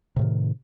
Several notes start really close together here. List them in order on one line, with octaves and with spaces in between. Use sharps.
C3 A2 D#3